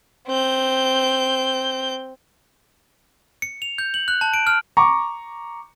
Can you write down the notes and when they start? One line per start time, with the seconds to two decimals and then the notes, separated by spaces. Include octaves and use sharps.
0.28 C4 G6
3.42 C#7
3.62 F7
3.78 G6
3.94 F#7
4.08 F#6
4.21 A5
4.34 D7
4.47 F6
4.77 A#5 C#6 D6